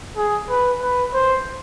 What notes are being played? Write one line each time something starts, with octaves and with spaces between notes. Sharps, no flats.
G#4
B4
B4
C5